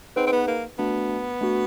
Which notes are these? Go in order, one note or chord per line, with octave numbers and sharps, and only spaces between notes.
C4 D#4 G#4 B4 D#5 F#5
C4
B3
A#3
A3 B3 D4 F#4
A3 D4 F#4